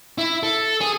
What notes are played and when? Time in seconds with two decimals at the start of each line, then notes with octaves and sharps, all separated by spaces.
0.18 E4
0.43 A4
0.81 G#4